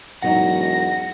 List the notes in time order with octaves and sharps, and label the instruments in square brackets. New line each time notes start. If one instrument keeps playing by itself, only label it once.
[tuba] E1 [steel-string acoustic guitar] F#2 F#3 D#4 [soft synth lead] F#5 [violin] A#6